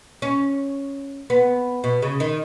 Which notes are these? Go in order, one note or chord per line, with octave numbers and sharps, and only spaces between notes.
C#4
B3
B2
C#3
D#3